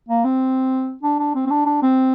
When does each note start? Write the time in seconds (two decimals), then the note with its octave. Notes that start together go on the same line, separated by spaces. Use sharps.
0.09 A#3
0.24 C4
1.03 D4
1.18 D4
1.35 C4
1.46 C4
1.50 D4
1.66 D4
1.82 C4